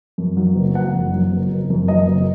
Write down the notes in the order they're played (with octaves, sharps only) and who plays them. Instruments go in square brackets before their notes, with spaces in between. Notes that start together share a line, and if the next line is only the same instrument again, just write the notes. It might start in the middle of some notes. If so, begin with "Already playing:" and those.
[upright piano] F#2
F#3
F#1
F#1 F#5
F#2
F#3
F#1
F#1
F#2
F#3 D#5
F#1